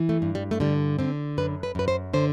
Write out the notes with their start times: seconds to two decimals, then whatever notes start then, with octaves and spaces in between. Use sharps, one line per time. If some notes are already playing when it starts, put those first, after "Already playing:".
Already playing: E3
0.09 A3
0.22 G2
0.35 G3
0.51 A3
0.60 D3 G3
0.99 D3 C4
1.38 F#2 B4
1.63 B4
1.75 F#2 B4
1.88 C5
2.14 D3 C5